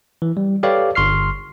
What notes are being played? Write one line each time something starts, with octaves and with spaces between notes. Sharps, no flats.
E3
G3
G4 A4 B4 C#5 D5 F5
G1 C6 C#6 F6 C7